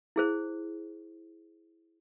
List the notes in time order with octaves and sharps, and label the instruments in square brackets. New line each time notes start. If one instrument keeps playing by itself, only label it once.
[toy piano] E4 G#4 C5